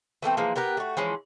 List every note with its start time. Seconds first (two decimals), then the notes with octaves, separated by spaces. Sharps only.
0.22 E3 A3 A#3 C4
0.37 E3 F3 G#3 A#3
0.56 B3 G4 A#4 B4
0.77 A3 F#4
0.97 E3 F3 G#3 C#4